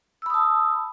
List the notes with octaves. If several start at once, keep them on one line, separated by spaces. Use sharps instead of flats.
A5 B5 D#6 E6